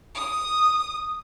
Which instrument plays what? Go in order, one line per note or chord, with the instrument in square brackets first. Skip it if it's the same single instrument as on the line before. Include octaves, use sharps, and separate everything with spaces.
[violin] D#6